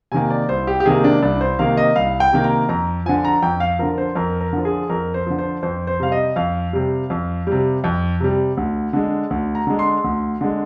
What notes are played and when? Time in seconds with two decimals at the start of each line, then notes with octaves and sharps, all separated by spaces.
0.12 C3 D#3 A#3 G#5
0.30 D5
0.49 C2 C5
0.67 G4
0.80 G4
0.86 C3 D#3 A#3 G#4
1.04 D4
1.22 C2 D4
1.41 C5
1.59 C3 D#3 A#3 F5
1.77 D#5
1.96 C2 F5
2.20 G5
2.32 C3 D#3 A#3
2.44 A#5
2.69 F2 A#5
3.06 D3 F3 G#5
3.25 A#5
3.42 F2 G5
3.60 F5
3.79 D3 F3 A#4
3.98 C5
4.15 F2 A#4
4.40 A#4
4.53 D3 F3
4.65 G#4
4.90 F2 A#4
5.14 C5
5.26 D3 F3
5.39 C5
5.63 F2 C5
5.87 C5
6.00 C3 G3 F5
6.12 D#5
6.36 F2 F5
6.73 C3 G3
7.10 F2
7.47 C3 G3
7.84 F2
8.20 C3 G3
8.57 D2
8.93 D3 G#3
9.30 D2
9.55 A#5
9.67 D3 G#3
9.79 C6
10.04 D2
10.41 D3 G#3